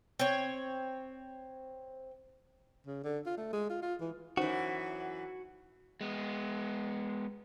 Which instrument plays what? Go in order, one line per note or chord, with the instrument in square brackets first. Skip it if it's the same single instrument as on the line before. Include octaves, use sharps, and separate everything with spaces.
[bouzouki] C4 C#5
[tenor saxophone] C#3
D3
F4
A3
G#3
F4
F4
E3
[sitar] F#2 E3 [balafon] D#4 C5 [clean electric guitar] F#4
[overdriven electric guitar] G#3 B3